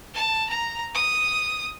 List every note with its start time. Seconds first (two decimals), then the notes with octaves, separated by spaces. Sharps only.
0.14 A5
0.49 A#5
0.95 D#6